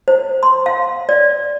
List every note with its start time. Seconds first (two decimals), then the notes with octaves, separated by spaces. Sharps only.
0.08 C5
0.43 C6
0.66 F5
1.09 D5